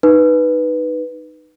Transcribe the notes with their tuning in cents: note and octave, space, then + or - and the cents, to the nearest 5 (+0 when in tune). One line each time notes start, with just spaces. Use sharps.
D#4 -10 B4 +0